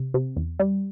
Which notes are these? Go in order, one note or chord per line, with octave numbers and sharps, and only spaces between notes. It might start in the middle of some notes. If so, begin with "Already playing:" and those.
Already playing: C3
C3
E2
G3